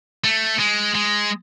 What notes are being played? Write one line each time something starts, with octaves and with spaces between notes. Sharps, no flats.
A3
G#3
G#3